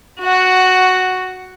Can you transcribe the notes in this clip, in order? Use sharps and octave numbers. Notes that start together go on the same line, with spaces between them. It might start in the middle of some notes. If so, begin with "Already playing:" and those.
F#4 F#5